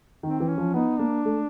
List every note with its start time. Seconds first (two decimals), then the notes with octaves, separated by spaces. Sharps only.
0.23 D#3 C4
0.40 E3
0.49 C#4
0.58 F3
0.74 B3 D#4
0.99 A#3 D4
1.25 A3